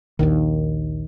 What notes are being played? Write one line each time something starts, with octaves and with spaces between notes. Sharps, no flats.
A#1 D#2 D#3